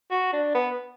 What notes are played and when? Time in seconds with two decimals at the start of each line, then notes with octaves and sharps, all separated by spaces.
0.11 F#4
0.33 D4
0.54 B3